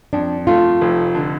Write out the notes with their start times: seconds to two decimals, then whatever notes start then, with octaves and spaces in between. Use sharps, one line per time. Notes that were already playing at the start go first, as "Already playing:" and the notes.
0.13 F2 D4
0.47 A3 F4
0.81 F1
1.15 D3